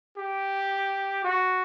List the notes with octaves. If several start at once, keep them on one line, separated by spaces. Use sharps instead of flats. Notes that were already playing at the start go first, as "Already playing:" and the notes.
G4
F#4